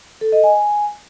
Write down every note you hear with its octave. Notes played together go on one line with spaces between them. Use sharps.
A4
D#5
G#5